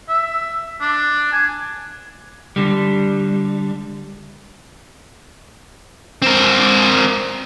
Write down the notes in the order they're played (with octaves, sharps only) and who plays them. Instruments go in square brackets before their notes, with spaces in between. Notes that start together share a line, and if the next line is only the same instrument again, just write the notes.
[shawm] E5
D4
G#5
[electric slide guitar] D3 G3
[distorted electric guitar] C4 A#4